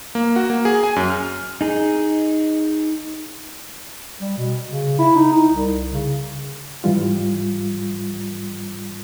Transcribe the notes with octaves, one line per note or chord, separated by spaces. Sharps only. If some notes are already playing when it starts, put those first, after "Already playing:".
A#3
F#4
A#3
G#4
G#5
F#2
F6
D#4 G#4
G3
B2
C#3
E4
D#4
D#4
C2
C#3
G#2 E3 G3 F4